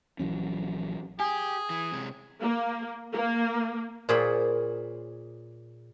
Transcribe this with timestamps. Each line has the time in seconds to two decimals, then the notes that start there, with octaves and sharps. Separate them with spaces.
0.19 A#1 E3 F#3 C#4
1.20 G4 G#4 G#5
1.70 E3
1.92 C3 G#3
2.41 A#3
3.13 A#3
4.09 A#2 F4 G#4 C5 C#5 B5